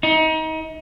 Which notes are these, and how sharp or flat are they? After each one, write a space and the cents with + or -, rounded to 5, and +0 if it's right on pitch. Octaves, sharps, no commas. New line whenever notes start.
D#4 +30